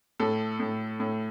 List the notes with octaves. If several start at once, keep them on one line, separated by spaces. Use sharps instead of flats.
A2 A4
A2
A2